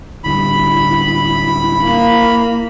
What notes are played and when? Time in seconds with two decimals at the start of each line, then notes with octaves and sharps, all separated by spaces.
0.24 D1 D3 G3 E4 B5
1.86 A#3